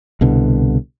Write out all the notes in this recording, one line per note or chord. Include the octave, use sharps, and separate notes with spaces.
C2 B2 D3